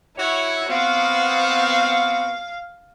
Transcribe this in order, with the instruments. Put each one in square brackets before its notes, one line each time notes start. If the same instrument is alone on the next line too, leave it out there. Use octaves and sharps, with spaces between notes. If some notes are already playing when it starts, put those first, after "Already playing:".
[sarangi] E4 [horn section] F#4 C#5
[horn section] B3 C4 F#4 [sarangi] F5